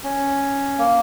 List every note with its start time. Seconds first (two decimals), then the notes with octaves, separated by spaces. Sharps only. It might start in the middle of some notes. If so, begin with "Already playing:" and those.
0.04 C#4
0.78 A#3